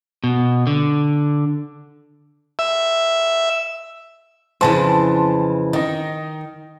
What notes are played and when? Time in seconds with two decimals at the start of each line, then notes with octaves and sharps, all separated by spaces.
0.24 B2
0.67 D3
2.59 E5
4.61 F2 C#3 E3 A5 C6
5.73 D#3 D#4 D#5